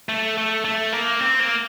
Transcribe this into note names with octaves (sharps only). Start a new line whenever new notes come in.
A3
A3
A3
A#3
C4
A#3